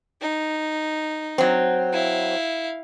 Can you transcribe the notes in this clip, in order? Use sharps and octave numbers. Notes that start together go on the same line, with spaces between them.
D#4
F#3 C4
E4 F5